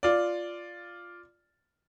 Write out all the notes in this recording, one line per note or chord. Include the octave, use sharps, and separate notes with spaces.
F4 D5